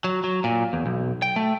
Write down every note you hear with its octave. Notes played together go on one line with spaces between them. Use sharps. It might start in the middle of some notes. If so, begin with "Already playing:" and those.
F#3
F#3
A#2
E2
B1
G5
A3